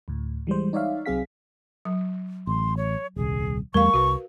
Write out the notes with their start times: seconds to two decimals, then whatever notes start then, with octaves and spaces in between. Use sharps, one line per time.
0.08 D2 A2
0.47 E3 G3 G#3 C5
0.73 D#4 C#5 D5 E5 F5
1.06 C2 F#3 C4 G#4 F5 B6
1.85 F#3
2.47 A1 C6
2.77 C#5
3.16 D#1 C2 G#4
3.74 E2 G3 A3 A#4 F5 C#6
3.94 C2 F#4 B4